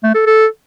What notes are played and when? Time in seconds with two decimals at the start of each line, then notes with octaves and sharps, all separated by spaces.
0.04 A3
0.15 A4
0.26 A4